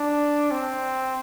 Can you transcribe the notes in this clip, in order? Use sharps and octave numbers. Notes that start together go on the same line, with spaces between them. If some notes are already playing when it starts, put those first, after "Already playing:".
Already playing: D4
C4